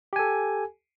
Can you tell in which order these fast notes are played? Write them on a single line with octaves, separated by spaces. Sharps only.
G4 G#5 A4